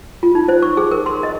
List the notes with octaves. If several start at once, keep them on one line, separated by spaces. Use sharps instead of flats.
F4
D#4
C5
C#6
G#4
A#4
C6
D#5